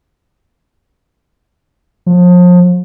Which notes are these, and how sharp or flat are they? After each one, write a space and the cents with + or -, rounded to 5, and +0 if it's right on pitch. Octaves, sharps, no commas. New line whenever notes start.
F3 +35